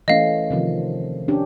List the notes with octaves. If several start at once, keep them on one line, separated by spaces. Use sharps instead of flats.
E3 A3 C#4 D#5 F5
C3 D#3 F3
C#4 D4 G4